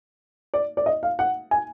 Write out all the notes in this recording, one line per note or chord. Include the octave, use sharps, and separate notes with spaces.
D5
D5
D#5
F5
F#5
G#5